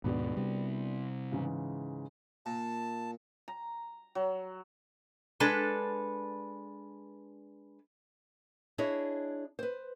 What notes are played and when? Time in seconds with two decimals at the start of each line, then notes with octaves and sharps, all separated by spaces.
0.04 D#2 G#2 B2 B3 D4 F#4
0.37 C3 G3
1.32 G#2 C#3 E3
2.46 A#2 A5
3.48 A#5
4.15 F#3
5.40 G#3 D4 A4 B4
8.78 D4 E4 G#4 C#5 D#5
9.59 B4 C5